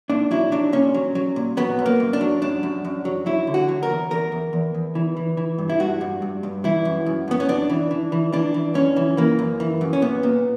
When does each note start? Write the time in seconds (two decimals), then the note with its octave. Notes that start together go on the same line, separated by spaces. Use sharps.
0.10 A#2 D4
0.31 F#3 E4
0.52 F#3 D4
0.73 A#2 C#4
0.94 F#3
1.15 F#3
1.36 A#2
1.57 F#3 B3
1.79 F#2
1.86 A#3
2.00 F#2
2.13 D4
2.21 F#3
2.42 F#2 D4
2.63 F#2
2.84 F#2
3.05 F#3
3.26 F#3 E4
3.47 D3
3.54 F#4
3.69 F#3
3.83 A#4
3.90 E2
4.11 E2 A#4
4.32 E2
4.53 E2
4.74 E2
4.95 E3
5.17 E3
5.37 E3
5.58 G2
5.70 E4
5.80 G2 F#4
6.01 G2
6.22 G2
6.43 G2
6.64 E3 E4
6.85 F#2
7.06 F#2
7.28 F#2 B3
7.40 C#4
7.49 F#2 D4
7.69 E3
7.91 E3
8.12 E3
8.33 E3 D4
8.54 E3
8.75 F#2 C#4
8.96 E3
9.17 E3 A#3
9.39 F#2
9.60 E3
9.81 F#2
9.93 C#4
10.02 A#2 B3
10.23 A#2